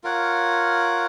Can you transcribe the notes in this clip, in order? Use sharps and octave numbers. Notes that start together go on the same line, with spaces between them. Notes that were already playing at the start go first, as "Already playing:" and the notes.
F4 A#4 C#5 F#5